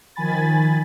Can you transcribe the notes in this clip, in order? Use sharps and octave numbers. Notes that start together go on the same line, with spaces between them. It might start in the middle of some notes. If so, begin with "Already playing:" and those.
D#3 F3 G#5 B5 A6